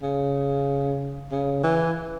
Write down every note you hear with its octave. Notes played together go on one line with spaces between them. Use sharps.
C#3
C#3
E3